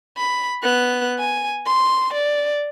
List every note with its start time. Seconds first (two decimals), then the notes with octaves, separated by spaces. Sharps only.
0.17 B5
0.63 B3 F#6
1.19 G#5
1.66 C6
2.13 D5